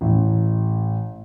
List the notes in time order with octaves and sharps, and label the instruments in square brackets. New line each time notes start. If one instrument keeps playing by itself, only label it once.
[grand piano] A1